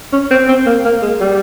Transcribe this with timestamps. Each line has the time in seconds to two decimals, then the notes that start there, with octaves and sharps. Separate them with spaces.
0.13 C#4
0.31 C4
0.48 C4
0.66 A#3
0.85 A#3
1.02 G#3
1.21 G3